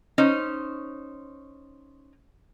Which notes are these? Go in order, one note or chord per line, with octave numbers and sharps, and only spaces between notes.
C#4 D#4 C5